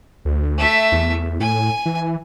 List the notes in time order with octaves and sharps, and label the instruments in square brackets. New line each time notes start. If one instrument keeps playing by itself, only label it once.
[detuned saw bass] D2
[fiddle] A3 E5
[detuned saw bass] E2
[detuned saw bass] A2 [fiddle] G#5
[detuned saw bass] E3